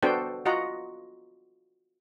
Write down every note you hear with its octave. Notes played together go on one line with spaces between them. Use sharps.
B3 D4 F#4 A4 C5 G5
F4 F#4 D#5 F#5 A#5